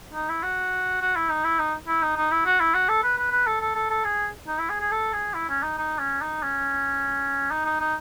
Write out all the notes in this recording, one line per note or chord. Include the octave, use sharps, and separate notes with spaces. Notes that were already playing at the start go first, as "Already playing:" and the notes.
D#4
E4
F#4
F#4
E4
D#4
E4
D#4
E4
D#4
D#4
E4
F#4
E4
F#4
A4
B4
B4
B4
A4
A4
A4
A4
G#4
D#4
E4
G#4
G#4
A4
G#4
E4
C#4
D#4
D#4
C#4
D#4
C#4
D#4
D#4
D#4